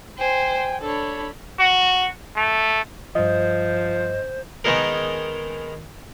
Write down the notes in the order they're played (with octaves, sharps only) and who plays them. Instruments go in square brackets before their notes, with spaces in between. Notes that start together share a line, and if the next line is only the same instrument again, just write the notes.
[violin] C5 [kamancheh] G5 G#5
[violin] D4 B5 [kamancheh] A4 C#5
[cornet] F#4
A3
[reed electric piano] G2 D#5 [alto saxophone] F3 [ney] C5
[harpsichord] D#3 G#3 B3 D#4 G#4 A#4